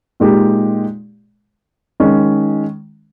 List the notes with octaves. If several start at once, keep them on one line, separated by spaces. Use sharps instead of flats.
A#2 G#3 D#4 G4
D#3 G#3 C#4